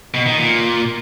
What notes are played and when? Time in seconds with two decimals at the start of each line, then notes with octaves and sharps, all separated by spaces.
0.14 B2
0.26 D#3
0.38 A#2